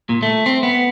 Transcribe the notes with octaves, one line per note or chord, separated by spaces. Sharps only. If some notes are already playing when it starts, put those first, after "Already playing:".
A#2
A3
C4
B3